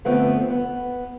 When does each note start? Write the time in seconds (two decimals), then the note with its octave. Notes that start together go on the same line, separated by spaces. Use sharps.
0.05 G2 D3 F3 A3 B3 C4
0.50 B3